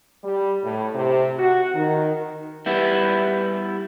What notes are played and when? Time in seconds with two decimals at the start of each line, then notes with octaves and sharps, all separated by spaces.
0.23 G3
0.64 A2
0.94 C3
1.38 F#4
1.74 D#3
2.66 G3 B3 E4